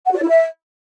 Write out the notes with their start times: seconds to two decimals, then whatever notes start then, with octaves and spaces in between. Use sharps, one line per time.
0.06 F#5
0.11 F#4
0.17 D5
0.23 E4
0.28 E5